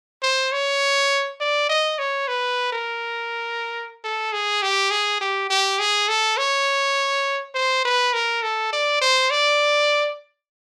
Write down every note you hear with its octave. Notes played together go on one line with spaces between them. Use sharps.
C5
C#5
D5
D#5
C#5
B4
A#4
A4
G#4
G4
G#4
G4
G4
G#4
A4
C#5
C5
B4
A#4
A4
D5
C5
D5